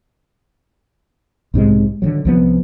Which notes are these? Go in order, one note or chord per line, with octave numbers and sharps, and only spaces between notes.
B1 G#2 C3 G#3
D3 E3 F#3
C2 F3 B3